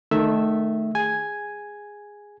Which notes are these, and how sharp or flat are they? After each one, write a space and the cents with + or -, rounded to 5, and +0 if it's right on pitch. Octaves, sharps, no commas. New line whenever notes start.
D#3 -20 A3 +0 E5 +0
G#4 -10 G#5 +0